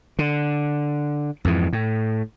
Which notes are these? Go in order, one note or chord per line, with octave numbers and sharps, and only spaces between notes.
D3
F2 G#2 E3
A2